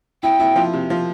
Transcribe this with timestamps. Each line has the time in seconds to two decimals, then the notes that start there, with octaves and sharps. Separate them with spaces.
0.23 E4 G5
0.40 E4
0.56 F3
0.73 C3
0.90 F3